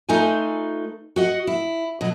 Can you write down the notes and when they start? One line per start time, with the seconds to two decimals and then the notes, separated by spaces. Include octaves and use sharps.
0.09 A3 D#4 F4 B4 G#5
1.16 F#4 D#5 F#5
1.47 E4
2.01 B2 F#3